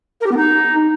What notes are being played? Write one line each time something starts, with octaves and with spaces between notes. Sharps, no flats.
A#4
G4
B3
D#4